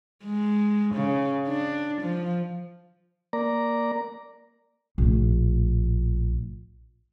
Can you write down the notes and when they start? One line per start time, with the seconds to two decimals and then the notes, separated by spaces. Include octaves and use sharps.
0.25 G#3
0.95 C#3
1.48 D4
2.02 F3
3.33 A#3 D5 A#5
4.98 A#1 A2